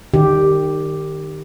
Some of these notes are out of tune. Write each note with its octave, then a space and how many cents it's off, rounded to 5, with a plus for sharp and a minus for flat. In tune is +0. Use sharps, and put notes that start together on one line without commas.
D#3 -30 G4 +0